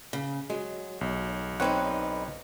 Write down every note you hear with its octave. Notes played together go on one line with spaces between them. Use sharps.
C#3
F#3 G#3
B1
D3 C4 D#4 B4 C#5 F#5